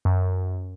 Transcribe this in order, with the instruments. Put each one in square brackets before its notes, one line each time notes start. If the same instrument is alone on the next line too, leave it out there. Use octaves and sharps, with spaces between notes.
[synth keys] F#2